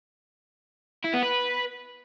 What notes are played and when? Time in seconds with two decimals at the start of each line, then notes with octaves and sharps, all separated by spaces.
1.04 E4
1.13 B3
1.23 B4